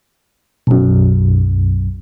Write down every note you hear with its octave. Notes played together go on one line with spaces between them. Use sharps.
B1 F#2